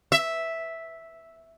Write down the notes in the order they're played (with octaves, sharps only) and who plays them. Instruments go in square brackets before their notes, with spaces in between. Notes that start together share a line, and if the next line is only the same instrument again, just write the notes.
[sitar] E5